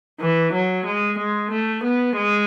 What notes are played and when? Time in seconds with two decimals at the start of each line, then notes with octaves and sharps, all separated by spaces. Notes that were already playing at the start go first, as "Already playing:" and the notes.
0.21 E3
0.53 F#3
0.85 G#3
1.18 G#3
1.51 A3
1.84 B3
2.16 G#3